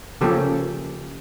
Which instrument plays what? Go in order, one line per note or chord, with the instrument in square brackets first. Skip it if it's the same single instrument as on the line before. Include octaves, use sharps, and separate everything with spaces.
[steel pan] C#3 F3 A#3 C#4 G4 A4